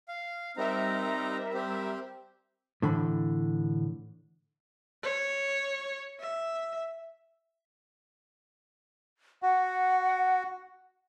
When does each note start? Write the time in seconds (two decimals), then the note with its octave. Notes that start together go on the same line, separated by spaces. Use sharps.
0.08 F5
0.57 G3 C4 D#4 A#4 E5 A#5
1.54 C4 G4
2.82 A2 D3 E3 B5
5.03 C#5
6.20 E5
9.43 F#4 F#5